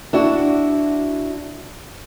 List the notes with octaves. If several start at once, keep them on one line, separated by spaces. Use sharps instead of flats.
D4 E4 F#4